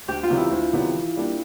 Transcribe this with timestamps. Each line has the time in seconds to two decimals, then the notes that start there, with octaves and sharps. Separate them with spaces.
0.08 D2 G4
0.23 F4
0.30 C3 D#3 F#3 B3
0.37 E4
0.51 D2
0.73 C3 D#3 F#3 B3
0.95 E3
1.16 G3 A#3 D4